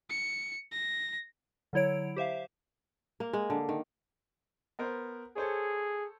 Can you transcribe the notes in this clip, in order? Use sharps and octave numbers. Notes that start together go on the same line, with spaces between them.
C#7
A#6
D3 F#3 E4 C#5 D7
G4 C5 E5 F5
A#3
G#3
D3
D#3
B3 A#4 C5
G#4 A4 C5 C#5